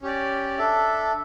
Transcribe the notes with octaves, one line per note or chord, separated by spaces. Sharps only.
C#4 G4 D5
D4 A4 E5